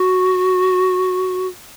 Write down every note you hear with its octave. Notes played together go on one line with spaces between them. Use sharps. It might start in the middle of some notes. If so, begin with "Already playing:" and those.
Already playing: F#4